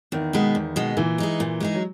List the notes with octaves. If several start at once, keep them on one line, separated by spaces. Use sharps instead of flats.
E2 D#3
B2 G#3 B3
E2
B2 G#3 B3
A#2 E3
G#3 D#4 G#4
A#2
G#3 D#4 G#4
F#3